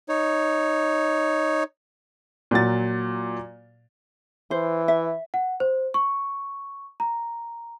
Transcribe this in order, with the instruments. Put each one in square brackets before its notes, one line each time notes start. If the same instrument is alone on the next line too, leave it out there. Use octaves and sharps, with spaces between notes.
[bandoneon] D#4 C#5
[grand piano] A#2 F#3 A6
[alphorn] E3 [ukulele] C5
[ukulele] E5
[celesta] F#5
C5
C#6
A#5